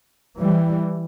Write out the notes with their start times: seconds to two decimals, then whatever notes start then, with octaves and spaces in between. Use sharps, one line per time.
0.38 E3 G3